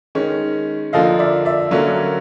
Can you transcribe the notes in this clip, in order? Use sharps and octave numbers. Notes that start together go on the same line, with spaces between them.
D#3 G#3 C#4
D3 F3 A#3 D#5 F5
D5 E5
D5 E5
D3 F#3 A#3 C#4